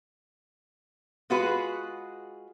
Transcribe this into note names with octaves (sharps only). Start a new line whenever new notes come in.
G#3 F4 F#4 G#4 B4